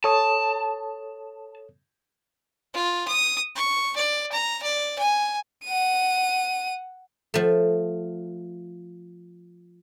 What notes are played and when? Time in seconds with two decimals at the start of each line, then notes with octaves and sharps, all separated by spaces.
0.04 A4 C#5 A5 D#6
2.74 F4
3.08 D#6
3.56 C#6
3.96 D5
4.32 A#5
4.63 D5
4.99 G#5
5.65 F#5 D#7
7.34 F3 A3